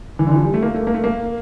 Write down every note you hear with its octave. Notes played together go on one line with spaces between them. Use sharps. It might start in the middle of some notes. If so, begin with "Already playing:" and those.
E3
D3
E3
F3
G3
A3
A#3
A3
A#3
A3
A#3